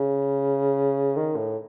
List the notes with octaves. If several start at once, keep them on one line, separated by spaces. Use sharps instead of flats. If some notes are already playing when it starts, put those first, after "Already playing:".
Already playing: C#3
D#3
A2